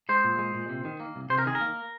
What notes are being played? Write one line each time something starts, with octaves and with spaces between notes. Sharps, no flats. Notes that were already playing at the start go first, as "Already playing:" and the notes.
G#3 C5
A#2
G#3
A#2
C3
D#3
A#3
C2
C3 C5
A#4
D#3 G#4
A#4
A#3